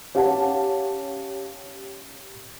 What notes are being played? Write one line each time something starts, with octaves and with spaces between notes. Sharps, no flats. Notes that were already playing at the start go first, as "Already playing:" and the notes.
C#4 G4 F5 F#5 A5